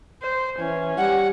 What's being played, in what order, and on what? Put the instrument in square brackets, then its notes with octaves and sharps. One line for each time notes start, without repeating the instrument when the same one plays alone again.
[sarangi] C5
[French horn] E3 [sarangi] C#4
[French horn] G3 [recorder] F#5